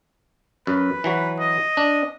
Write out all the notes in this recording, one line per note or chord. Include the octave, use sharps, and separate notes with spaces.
F#2 B4
E3 F#3 F#4
D#5
D4